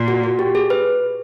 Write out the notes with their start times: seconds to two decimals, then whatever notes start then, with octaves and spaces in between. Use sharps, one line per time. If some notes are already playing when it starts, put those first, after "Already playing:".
Already playing: A#2
0.08 F#4
0.24 F#4
0.39 G4
0.55 G#4
0.70 B4